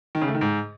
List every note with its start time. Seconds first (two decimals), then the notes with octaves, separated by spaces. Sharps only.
0.15 D#3
0.21 C#3
0.28 A3
0.35 D#3
0.41 G#2